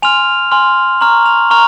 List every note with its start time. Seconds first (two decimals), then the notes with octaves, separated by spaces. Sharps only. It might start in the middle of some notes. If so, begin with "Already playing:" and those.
0.02 G#5 C6 F6 F7
0.51 G#5 C6 F6
1.01 A#5 C#6 F6 F#7
1.26 F7
1.50 A#5 C#6 F6 F7